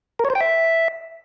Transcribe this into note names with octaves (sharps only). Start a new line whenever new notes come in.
A#4
C#5
C5
G5
E5